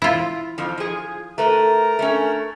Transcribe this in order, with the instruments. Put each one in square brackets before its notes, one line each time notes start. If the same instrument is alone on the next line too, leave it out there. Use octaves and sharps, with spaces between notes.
[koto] E4 F4
[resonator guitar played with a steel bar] F2 F3
F3 G#4
[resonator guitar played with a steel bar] A3 B4 [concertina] A#4 A#5
[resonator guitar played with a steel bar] A3 C#4